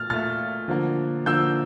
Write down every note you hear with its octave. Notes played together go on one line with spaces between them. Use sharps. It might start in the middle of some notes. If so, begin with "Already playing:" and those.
Already playing: A#2 A3 F6 A6
A#2 A3 F6 A6
D3 F3 A#3
D3 F3 A#3 E6 G6